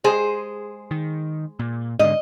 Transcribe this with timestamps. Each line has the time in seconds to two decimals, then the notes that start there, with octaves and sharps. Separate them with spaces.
0.04 G#3 G#4 C5
0.91 D#3
1.59 A#2
1.99 G#2 D3 D#5